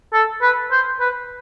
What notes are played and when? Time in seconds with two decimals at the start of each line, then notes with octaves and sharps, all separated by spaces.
0.13 A4
0.42 B4
0.71 C5
1.00 B4